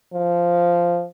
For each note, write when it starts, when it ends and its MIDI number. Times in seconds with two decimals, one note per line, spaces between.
0.14 1.04 53